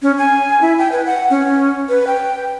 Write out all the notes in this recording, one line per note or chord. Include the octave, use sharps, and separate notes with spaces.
C#4
G#5
E4
G5
B4
F#5
C#4
B4
G5